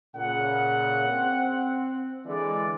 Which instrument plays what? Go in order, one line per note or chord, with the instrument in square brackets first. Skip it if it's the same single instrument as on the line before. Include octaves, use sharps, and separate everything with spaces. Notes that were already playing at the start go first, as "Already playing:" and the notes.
[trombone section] A#2 C#3 [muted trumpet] F#5
[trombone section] C4
[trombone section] D3 E3 G#3 [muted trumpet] D5